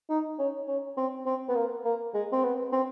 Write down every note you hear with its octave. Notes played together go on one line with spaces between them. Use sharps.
D#4
C#4
C#4
C4
C4
B3
A#3
A#3
G#3
C4
B3
C4